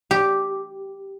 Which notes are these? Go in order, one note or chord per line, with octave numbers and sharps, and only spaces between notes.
G4